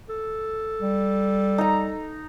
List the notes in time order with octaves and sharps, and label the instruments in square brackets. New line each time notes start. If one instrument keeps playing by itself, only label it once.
[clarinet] A4
[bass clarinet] G3
[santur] D#4 A#5